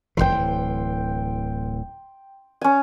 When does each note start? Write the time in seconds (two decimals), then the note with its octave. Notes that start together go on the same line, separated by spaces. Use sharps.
0.17 D1 C#2 E3 G5 C6
2.61 C#4 G#5